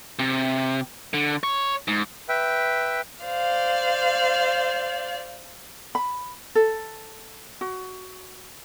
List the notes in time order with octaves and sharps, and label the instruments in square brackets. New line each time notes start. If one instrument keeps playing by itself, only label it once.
[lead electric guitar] C3
D3
C#5
G#2
[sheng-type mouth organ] B4 E5 G5
[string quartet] C5 D5 F5
[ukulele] B5
A4
F#4